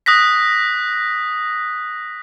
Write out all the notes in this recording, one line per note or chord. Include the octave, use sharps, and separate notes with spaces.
D#6 F#6 A#6 B6